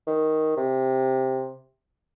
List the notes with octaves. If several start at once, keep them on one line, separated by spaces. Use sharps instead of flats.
D#3
C3